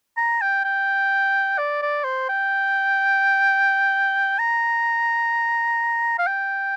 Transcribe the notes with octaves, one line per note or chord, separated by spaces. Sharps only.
A#5
G5
G5
D5
D5
C5
G5
A#5
F5
G5